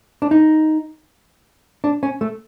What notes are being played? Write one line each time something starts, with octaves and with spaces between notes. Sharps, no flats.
D4
D#4
D4
C#4
A3